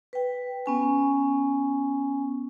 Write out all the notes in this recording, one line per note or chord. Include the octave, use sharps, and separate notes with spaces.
B4 G5
B3 C#4 G#5